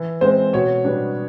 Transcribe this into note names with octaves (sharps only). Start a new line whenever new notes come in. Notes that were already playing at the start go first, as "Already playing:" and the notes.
Already playing: E3
G#3 C4 C5
B2 C#5
G3 B3 D4